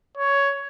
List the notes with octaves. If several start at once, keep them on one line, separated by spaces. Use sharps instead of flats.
C#5